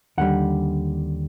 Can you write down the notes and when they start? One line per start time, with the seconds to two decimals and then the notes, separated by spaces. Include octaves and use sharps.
0.18 D#2 D3 G3 F#5